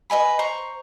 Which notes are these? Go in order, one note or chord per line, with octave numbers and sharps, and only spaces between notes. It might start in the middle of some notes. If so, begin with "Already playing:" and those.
B4 D#5 G#5 B5
C5 A#5 C#6